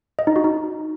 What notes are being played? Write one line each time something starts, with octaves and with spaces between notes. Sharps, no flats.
D#5
D#4
F#4
D#4